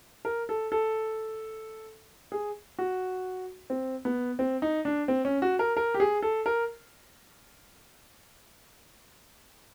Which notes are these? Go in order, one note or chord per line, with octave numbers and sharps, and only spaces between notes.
A#4
A4
A4
G#4
F#4
C4
B3
C4
D#4
D4
C4
C#4
F#4
A#4
A#4
G4
G#4
A4
A#4